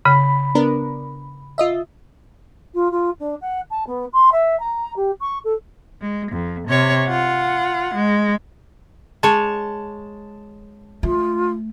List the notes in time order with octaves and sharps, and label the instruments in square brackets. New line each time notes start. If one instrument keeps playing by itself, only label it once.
[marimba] C#3 [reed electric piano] B5
[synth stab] B3 D4 A#4
F4 D#5 E5
[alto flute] F4
F4
D4
F#5
A5
B3
C6
E5
A#5
G4
C#6
A4
[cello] G#3
F2
C3 C#5
F4 F#5
G#3
[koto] G#3 C#5 [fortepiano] A5
[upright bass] A3 [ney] F4